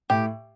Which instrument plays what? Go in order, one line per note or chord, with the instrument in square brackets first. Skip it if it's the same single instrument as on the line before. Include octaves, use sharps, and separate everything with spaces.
[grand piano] A2 [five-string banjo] G4